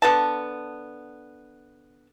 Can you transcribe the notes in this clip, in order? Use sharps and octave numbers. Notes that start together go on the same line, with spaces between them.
D3 B3 A5